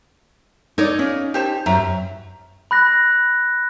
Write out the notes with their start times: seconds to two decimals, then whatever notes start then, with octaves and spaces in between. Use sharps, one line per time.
0.78 D#4 A4 C#5 D5
0.99 C#4 F4
1.34 G4 C5 A5
1.66 F#2 E5 A#5
2.71 B5 F#6 A#6